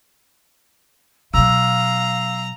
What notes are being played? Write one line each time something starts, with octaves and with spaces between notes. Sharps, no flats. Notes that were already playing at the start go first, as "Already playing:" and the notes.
B2 F#3 F5 A#5 E6